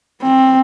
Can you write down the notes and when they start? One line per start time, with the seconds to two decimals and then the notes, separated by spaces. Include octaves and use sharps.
0.22 C4